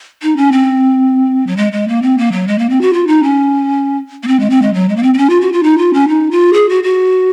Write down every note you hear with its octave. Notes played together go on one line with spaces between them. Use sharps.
D#4
C#4
C4
F#3
G#3
G#3
A#3
C4
A#3
F#3
G#3
A#3
C4
F#4
F4
D#4
C#4
A#3
C4
G#3
C4
G#3
F#3
G#3
A#3
C4
C4
C#4
F4
F#4
F4
D#4
F4
C#4
D#4
F4
G#4
F#4
F#4